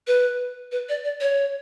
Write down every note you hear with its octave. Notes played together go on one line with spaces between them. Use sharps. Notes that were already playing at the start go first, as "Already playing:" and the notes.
B4
B4
D5
D5
C#5